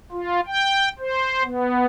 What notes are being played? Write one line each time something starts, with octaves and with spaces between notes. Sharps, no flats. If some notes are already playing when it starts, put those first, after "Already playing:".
F4
G5
C5
B3